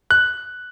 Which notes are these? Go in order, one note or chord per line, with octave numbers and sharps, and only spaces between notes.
F#6